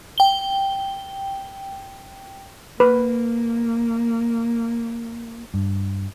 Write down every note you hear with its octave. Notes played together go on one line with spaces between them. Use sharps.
G5 G7
A#3 B4
G2